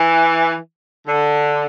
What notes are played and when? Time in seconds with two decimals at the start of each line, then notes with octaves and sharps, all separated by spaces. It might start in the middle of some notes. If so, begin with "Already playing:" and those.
Already playing: E3
1.06 D3